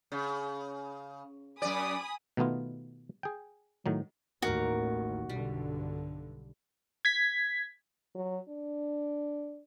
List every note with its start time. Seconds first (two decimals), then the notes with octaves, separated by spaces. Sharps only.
0.12 C#3
1.62 F#2 D5 G#5 B5 D#6
2.37 B2 D#3 A3 B3 F4
3.23 G#4 G5
3.86 A2 D#3 F#3
4.42 A1 D#2 D#3 F#4 A#4 D6
5.29 B1 G2 D3 G3
7.05 G#6 B6
8.15 F#3
8.49 D4